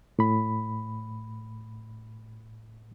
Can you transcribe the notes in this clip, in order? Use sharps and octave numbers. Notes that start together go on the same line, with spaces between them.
A2 B5